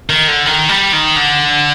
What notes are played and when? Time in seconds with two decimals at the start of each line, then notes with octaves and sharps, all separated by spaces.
0.09 D#3
0.28 D3
0.46 D#3
0.69 G3
0.93 D#3
1.16 D3